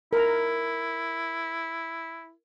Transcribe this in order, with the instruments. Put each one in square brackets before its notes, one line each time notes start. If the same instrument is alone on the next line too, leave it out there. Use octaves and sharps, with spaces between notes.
[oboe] E4 [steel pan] A#4 A#5